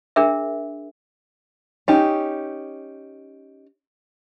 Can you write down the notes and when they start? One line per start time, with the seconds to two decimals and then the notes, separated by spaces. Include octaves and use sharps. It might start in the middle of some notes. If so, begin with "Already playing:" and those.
0.16 D4 G#4 A#4 E5
1.88 C#4 D#4 G4